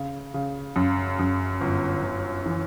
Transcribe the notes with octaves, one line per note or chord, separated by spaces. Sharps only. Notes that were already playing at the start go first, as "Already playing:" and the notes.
Already playing: C#3
C#3
F#2
F#2
G1
G1
E3